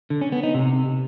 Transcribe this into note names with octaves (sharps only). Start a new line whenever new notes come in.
D3
C#4
B3
D#4
C3